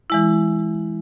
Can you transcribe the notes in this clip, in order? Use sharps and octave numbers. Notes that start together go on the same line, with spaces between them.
E3 G#3 E4